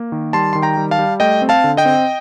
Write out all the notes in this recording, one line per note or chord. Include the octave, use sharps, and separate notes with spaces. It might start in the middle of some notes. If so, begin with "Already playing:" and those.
Already playing: A#3
D#3
G3 A5 C6
D#3 C6
G5 A#5
G3
F5 A5
G3
A3 D#5 G5
C4
F5 A5
D3
D#5 G5
C4